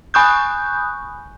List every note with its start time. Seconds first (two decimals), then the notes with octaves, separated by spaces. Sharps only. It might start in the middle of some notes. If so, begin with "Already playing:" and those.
0.14 G#5 B5 C#6 D#6 F#6 G6